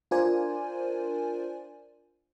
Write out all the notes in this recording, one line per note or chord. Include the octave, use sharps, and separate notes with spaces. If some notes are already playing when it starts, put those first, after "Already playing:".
D4 F4 A#4 C5 D5 G#5